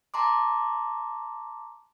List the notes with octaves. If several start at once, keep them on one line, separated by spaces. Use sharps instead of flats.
A5 A#5 C6 D6